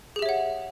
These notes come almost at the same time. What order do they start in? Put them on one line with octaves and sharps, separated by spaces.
G#4 G4 E5 C#5 F#5